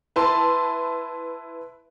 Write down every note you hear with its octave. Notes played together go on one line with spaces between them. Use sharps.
E4 B4 A5 C6